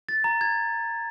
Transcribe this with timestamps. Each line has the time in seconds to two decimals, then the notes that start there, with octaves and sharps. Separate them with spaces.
0.09 A6
0.24 A#5
0.41 G#6